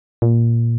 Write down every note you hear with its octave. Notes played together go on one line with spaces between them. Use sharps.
A#2